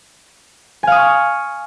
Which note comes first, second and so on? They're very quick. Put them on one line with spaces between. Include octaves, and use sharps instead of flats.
G#5 F5 D#6 C#6